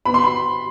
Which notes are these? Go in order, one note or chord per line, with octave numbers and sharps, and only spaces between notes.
B3 B5
C6
B5